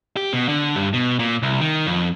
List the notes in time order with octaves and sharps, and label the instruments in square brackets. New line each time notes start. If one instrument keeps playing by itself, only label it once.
[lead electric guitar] G4
B2
D3
G2
B2
A#2
C2
D#3
F2